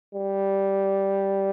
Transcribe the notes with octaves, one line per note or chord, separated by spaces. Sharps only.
G3